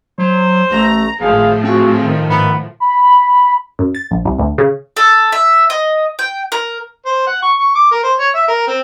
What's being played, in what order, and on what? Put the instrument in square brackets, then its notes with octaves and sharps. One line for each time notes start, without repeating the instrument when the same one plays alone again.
[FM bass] F#3 [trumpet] C5
[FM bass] A1 [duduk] A3 [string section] A#5
[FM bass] G#1 [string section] A2 F3 [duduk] G#4 [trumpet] F5
[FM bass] C4 [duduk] F#4 [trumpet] G#4
[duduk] D#3
[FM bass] G#2 [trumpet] B3
[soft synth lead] B5
[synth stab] F#2
A6
A#1
C2
D2
C#3
[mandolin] A4
E5
D#5
G5
A#4
[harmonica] C5
F#5
C#6
C#6
D6
A#4
C5
C#5
E5
A#4
C4